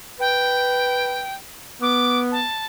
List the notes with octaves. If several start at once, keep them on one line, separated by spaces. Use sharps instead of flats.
B4 G5
B3 D6
A5